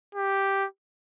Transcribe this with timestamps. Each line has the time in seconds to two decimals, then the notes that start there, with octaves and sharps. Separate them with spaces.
0.15 G4